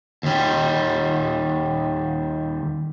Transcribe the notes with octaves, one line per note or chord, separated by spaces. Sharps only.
D#2 G3